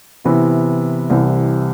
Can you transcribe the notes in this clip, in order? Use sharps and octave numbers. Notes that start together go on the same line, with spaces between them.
C3 E3 B3 E4 B4
C2 C3 E3